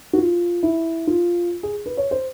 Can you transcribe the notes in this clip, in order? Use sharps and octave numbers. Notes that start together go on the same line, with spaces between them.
F#4
F4
E4
F4
G#4
B4
C#5
C5